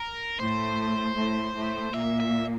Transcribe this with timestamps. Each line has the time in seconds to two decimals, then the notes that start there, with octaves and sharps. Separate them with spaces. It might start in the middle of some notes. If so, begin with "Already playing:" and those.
Already playing: A#4
0.39 A2 A3 C5
1.16 A2 A3
1.55 A2 A3
1.93 A#2 A#3 E5
2.20 E5